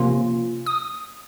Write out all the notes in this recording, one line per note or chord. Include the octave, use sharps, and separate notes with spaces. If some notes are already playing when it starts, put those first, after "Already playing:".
Already playing: C3 F3 A#3 C#4 F4
D#6